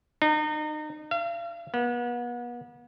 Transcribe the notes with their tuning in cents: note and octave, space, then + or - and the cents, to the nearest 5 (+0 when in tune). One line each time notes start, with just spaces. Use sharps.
D#4 -35
F5 -40
B3 -35